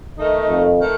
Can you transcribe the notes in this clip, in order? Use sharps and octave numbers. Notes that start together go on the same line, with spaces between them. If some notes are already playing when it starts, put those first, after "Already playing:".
D#3 A3 D#4
F2
D#3 A3